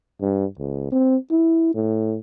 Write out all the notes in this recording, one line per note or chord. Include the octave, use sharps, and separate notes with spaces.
G2
C#2
C4
E4
A2